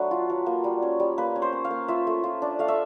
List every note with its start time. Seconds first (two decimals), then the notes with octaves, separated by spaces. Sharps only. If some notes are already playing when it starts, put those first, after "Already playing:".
Already playing: F#3 A3 D4 B4
0.11 F4
0.30 F#3
0.46 A#3
0.64 G3
0.82 C#4
1.00 G3
1.18 A#3 B4
1.36 C#4
1.42 C5
1.53 C#4
1.65 F5
1.70 A#3
1.88 F4 E5
2.07 A3
2.24 F4
2.42 D4
2.59 A3 F5
2.68 E5